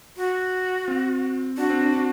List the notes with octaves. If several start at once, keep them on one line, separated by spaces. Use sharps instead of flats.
F#4
C4
D4 F#4
C4
D4
D4